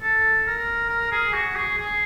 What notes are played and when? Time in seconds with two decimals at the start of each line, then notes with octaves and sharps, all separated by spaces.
0.02 A4
0.47 A#4
0.89 A#4
1.12 G#4
1.33 F#4
1.56 G#4
1.78 G#4